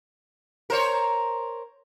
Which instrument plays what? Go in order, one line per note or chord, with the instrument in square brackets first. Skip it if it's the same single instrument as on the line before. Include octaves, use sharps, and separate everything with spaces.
[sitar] A#4 C5 C#5